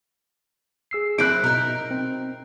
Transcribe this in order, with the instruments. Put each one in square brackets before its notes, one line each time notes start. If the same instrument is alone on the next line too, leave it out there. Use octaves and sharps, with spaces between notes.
[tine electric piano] G#4 E6 C7
[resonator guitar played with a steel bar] C4 E4 [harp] F#6 D7
[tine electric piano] B2 [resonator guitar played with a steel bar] D#4 A#4
[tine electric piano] C4